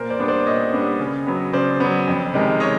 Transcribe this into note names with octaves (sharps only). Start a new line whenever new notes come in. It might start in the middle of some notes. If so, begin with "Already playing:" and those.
Already playing: A#2 A#4 C5
C5 D5
G3 B3 D4
C5 D5
A#2 C#5 D#5
G3 B3 D4
C#3
F#3 B3
C#3 C5 D5
F#3 B3
F2
C3 D#3 G#3
C#5 D#5